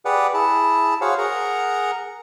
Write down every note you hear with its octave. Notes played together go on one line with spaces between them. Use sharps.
G4 G#4 B4 D5 F#5
E4 G#4 A5
F#4 G#4 C5 C#5 F5 F#5
G#4 A#4 F#5 A#5